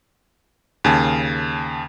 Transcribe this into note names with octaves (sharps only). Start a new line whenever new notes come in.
D#2 C#3 G#5 A5